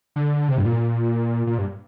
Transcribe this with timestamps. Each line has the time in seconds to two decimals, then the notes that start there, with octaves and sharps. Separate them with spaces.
0.16 D3
0.48 C3
0.58 G2
0.65 A#2
1.47 A#2
1.58 G2